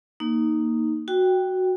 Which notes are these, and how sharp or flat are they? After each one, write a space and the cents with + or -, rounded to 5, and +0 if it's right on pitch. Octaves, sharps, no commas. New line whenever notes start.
A#3 +0 D#4 +0
F#4 +0 G5 +0